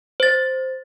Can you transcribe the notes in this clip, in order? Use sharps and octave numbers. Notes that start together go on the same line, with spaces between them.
C5 A6